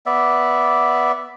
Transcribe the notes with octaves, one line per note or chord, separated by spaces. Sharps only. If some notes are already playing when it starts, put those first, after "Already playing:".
B3 D5 E5